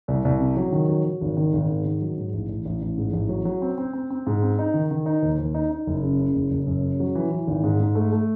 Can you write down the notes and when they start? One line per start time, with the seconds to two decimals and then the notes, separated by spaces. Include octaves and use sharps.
0.08 C2
0.25 C2
0.40 C3
0.57 F#3
0.72 D#3
0.89 F#3
1.05 F#3
1.21 G#1
1.37 D#3
1.53 G#1
1.69 G#2
1.85 D#3
2.01 F#3
2.17 G#2
2.33 A1
2.49 A1
2.65 A1
2.82 A1
2.98 G#2
3.13 A1
3.29 F#3
3.45 F#3
3.62 C4
3.78 C4
3.93 C4
4.10 C4
4.27 G#2
4.43 C4
4.59 D#4
4.74 D#3
4.91 D#3
5.06 D#4
5.22 D#2
5.39 D#2
5.55 D#4
5.71 D#4
5.87 F#1
6.02 C#3
6.19 C#3
6.35 F#1
6.51 F#1
6.67 F#2
6.83 C#3
7.00 F#3
7.15 E3
7.31 E3
7.47 G#1
7.63 G#2
7.80 G#2
7.95 A3
8.12 A3